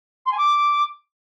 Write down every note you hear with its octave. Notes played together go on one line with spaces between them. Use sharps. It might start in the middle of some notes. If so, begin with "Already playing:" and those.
C6
G#5
D6